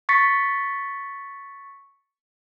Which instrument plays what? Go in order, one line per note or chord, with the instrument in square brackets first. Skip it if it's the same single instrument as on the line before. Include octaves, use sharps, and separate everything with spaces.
[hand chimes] C#6 A6 B6 C#7